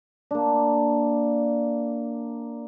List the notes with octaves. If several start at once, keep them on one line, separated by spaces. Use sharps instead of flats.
A#3 D4